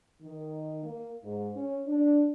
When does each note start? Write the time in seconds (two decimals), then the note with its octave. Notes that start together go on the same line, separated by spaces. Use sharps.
0.22 D#3
0.83 A#3
1.23 G#2
1.55 C#4
1.86 D4